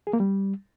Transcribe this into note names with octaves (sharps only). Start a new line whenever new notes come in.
G#4
A#3
G3